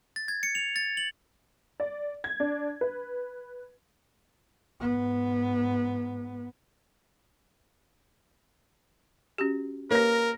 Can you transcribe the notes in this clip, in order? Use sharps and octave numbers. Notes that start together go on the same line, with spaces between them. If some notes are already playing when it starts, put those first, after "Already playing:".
A6
G#6
C#7
F7
A6
F#7
D5
G#6
D4
B4
G#2 B3
C#4 F#4 G4
A#3 G4 A#4 B4 C#5 A#6